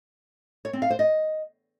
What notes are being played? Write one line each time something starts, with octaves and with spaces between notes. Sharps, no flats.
C#5
C4
F5
C5
D#5